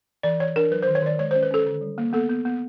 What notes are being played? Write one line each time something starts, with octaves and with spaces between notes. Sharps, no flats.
E3 D5
E3 C#5
D4 A#4
F#3 B4
D#3 C5
C#5
D#3 D5
G#3 C#5
C#4 C5
B4
C#4 A4
D3
G3
A#3
B3 A4
B3
B3